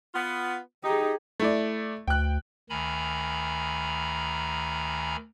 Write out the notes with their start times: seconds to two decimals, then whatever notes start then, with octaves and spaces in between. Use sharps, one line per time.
0.14 B3 F4
0.84 D#4 G4 G#4
1.40 A3 E4 D5
2.08 D2 G5 F#6
2.70 D2 D#3 G#5 A#5 B5